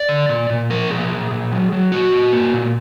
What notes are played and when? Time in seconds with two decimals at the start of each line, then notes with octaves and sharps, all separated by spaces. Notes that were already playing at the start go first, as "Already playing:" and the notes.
Already playing: D5
0.09 D3
0.29 A#2
0.50 A#2
0.70 F3 A#4
0.90 A#2 G#4
1.11 A#2
1.31 A#2
1.52 F#3
1.72 F#3
1.92 A#2 F#4
2.12 A#2
2.33 A#3
2.54 A#2